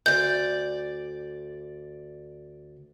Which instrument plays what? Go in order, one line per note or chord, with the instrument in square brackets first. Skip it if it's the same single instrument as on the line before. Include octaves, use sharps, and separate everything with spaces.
[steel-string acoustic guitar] D2 D5 [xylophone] G6